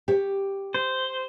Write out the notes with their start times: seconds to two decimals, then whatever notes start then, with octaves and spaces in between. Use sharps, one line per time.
0.08 G4 C#5
0.74 C5